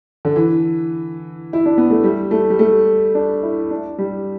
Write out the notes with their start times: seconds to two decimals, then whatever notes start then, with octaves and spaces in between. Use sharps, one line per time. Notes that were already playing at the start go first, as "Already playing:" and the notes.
0.25 D3
0.36 E3
1.53 E4
1.66 D4
1.78 B3
1.90 A3
2.04 G3
2.31 A3
2.50 G3
2.59 A3
3.15 D4
3.43 E4
3.71 D4
3.98 G3